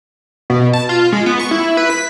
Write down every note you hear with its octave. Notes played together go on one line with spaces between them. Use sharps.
B2
A5
F4
G#3
B3
C#6
E4
B4
B6